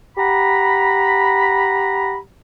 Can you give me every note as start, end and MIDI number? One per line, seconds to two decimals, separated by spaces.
0.17 2.17 67
0.17 2.17 78
0.17 2.17 82
0.17 2.17 83